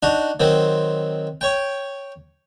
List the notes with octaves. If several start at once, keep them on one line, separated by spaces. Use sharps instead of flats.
D4 D#4 F#4
D#3 F#3 C4
C#5 G5